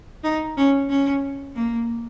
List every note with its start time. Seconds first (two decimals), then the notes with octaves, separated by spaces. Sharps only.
0.24 D#4
0.57 C#4
0.89 C#4
1.56 A#3